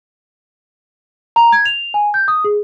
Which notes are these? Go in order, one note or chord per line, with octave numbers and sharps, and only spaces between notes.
A#5
G#6
F7
G#5
G6
D#6
G#4